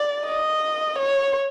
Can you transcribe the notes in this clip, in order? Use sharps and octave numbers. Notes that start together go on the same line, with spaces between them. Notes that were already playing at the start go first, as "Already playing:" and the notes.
Already playing: D5
D#5
C#5